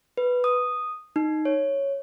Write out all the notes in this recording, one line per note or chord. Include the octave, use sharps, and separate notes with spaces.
B4
D#6
D#4
C#5